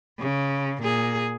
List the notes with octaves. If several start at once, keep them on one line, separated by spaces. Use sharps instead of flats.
C#3
A#2 G#4